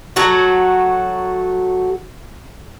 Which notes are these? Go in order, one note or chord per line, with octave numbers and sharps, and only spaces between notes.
F#3 A3 F#4